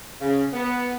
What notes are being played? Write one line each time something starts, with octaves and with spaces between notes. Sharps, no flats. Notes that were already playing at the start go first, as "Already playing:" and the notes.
C#3
B3